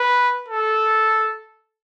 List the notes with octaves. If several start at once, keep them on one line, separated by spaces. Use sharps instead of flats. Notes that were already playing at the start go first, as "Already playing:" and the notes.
Already playing: B4
A4